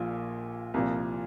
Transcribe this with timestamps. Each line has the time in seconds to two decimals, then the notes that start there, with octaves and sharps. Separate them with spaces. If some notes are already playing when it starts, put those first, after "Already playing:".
Already playing: A#1 A#2 F3
0.74 C2 A#2 F3